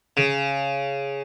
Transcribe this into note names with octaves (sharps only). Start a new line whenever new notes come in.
C#3